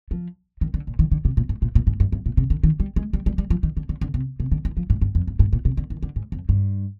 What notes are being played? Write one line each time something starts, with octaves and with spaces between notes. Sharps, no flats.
F3
D#3
D3
A#2
D#3
D3
C3
A#2
G#2
A#2
A#2
G#2
G2
G2
A#2
C3
D3
D#3
G3
G#3
G3
G3
G3
F3
D#3
D3
D3
D3
C3
C3
D3
D#3
F3
G#2
G2
F2
G2
G#2
A#2
C3
D3
D#3
D3
G#2
F2
G2